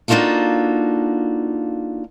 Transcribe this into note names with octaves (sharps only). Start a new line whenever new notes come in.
A#3 D4 D#4 F4 F#4 A4